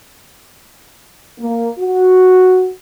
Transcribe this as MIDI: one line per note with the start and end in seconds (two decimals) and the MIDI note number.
1.40 1.68 58
1.79 2.71 66